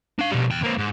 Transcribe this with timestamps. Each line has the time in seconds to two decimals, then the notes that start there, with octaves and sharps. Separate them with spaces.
0.19 D4 F5
0.32 B2 G3
0.51 E2 G5
0.63 A#3 C4
0.78 G#2